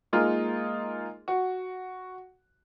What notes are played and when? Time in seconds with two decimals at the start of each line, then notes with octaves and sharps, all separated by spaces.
0.13 G#3 A#3 D#4 F4 G#4 A#4
1.28 F#4